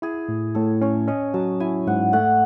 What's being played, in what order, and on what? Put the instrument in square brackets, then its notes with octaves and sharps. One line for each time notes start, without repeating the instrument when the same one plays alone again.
[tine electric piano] E4 [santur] G#4
[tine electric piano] A2
[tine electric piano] A2 [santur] A4
[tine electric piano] C#4 [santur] C#5
[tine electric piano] C#4 [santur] D#5
[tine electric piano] F#3 [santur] A5
[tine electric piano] E4 [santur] G#5
[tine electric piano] G#2 [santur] F#5
[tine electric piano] A3 [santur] F#5